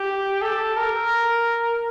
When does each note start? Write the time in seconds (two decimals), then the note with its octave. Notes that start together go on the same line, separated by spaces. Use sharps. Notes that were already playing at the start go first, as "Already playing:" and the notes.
Already playing: G4
0.42 A4
0.77 A#4